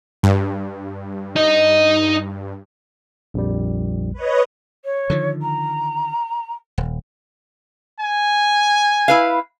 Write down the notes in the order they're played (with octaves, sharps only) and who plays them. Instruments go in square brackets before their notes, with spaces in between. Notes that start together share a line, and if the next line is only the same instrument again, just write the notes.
[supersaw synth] G2
[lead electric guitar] D#4 D#5
[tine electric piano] A#1 F2 G3
[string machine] B4 C#5 D#5
[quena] C#5
[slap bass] D3 D#3 F3
[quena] A#5
[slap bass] D#1
[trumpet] G#5
[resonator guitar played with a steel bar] E4 B4 F5